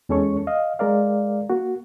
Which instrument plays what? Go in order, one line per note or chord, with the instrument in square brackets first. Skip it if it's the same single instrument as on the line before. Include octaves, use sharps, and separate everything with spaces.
[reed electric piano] E2 G#3 C#4 A4 C#5 C#6
D#5 F5
G#3 A#4 D5 F5
A#3 F#4